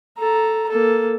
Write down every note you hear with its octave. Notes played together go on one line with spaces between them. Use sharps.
A4 A#5
A#3 A4